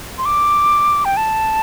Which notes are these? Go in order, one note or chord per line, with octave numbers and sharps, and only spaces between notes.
C6
D6
G5
A5